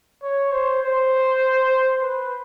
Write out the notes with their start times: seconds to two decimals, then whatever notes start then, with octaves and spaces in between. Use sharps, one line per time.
0.23 C#5
0.52 C5
0.82 C5
2.01 B4